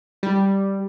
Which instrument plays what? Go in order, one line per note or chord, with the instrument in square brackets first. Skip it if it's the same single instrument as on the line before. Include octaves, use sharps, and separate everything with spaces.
[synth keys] G3